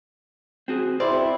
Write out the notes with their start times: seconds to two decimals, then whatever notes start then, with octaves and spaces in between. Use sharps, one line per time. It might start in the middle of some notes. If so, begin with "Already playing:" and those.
0.68 C4 F#4 G#4
1.00 C4 E4 D5